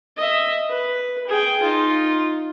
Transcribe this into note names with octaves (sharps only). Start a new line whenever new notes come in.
D#5 E5
B4
G#4 G5
D#4 F4